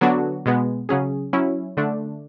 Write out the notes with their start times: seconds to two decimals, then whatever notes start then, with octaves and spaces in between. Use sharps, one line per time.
0.01 D3 F#3 B3 D4 F#4
0.46 B2 G#3 B3
0.89 C#3 F#3 C#4 G#4
1.33 F#3 C#4 E4
1.77 D3 A3 D4